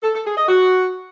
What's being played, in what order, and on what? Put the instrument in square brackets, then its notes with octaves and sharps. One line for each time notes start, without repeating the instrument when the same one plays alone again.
[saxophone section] A4
A4
G#4
D#5
F#4